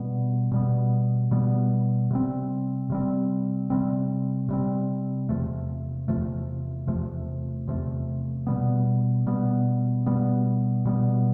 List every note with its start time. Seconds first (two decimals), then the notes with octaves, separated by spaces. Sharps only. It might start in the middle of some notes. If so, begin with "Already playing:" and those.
Already playing: B2 G3 B3
0.52 B2 G3 B3
1.31 B2 G3 B3
2.11 C3 G3 C4
2.90 C3 G3 C4
3.70 C3 G3 C4
4.49 C3 G3 C4
5.29 E2 C3 F3 A3
6.08 E2 C3 F3 A3
6.88 E2 C3 F3 A3
7.68 E2 C3 F3 A3
8.47 B2 G3 B3
9.26 B2 G3 B3
10.06 B2 G3 B3
10.85 B2 G3 B3